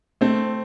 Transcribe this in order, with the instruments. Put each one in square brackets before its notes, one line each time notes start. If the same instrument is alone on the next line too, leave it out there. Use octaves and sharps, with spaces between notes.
[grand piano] A3 C4